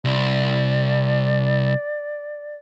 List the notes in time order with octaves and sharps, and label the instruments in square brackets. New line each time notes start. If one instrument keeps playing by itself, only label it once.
[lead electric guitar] C2 [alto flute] D5